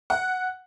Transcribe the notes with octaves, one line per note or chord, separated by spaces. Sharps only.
F#5